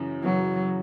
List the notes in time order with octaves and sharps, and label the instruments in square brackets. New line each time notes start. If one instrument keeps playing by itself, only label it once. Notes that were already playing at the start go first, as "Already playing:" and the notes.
Already playing: [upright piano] F#2 C#3 E3
[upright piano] F#2 C#3 E3 [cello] F#3